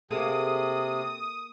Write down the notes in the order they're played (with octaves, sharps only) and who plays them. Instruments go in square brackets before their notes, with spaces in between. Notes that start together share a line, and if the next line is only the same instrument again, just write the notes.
[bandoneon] C3 [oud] A#3 G#4 A4 [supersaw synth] D#6